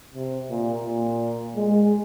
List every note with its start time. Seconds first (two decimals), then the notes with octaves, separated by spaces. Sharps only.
0.14 C3
0.50 A#2
0.86 A#2
1.56 G#3